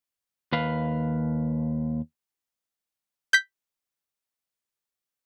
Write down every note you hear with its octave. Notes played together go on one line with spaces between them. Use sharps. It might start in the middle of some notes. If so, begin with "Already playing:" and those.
D#2 B4 F5
G6 B6